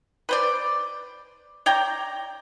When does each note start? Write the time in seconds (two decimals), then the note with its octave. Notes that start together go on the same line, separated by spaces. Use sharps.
0.29 B4 C5 D5
1.66 C#5 D5 G5 A#5